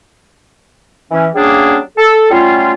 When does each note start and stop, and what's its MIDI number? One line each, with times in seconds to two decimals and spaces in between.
1.11 1.27 52
1.11 1.27 61
1.35 1.79 54
1.35 1.79 55
1.35 1.79 58
1.35 1.79 61
1.35 1.79 62
1.35 1.79 68
1.98 2.28 69
2.31 2.73 54
2.31 2.73 55
2.31 2.73 57
2.31 2.73 61
2.31 2.73 65